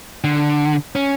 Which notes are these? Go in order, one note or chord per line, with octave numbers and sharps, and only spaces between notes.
D3
C#4